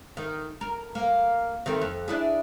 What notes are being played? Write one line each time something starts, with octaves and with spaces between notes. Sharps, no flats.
D#3
A#4
A#3
D#3 A3 C4
F2
D4 E4 G#4